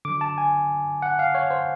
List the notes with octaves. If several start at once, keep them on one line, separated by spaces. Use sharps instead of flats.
D3 F#3 D6
A5
G#5
F#5
F5
C#5
C5